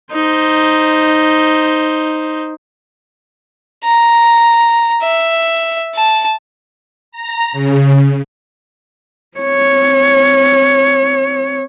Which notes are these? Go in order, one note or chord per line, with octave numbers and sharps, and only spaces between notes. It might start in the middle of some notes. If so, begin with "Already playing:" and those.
D#4 C5
A#5
E5
A5
A#5
C#3
C4 C#5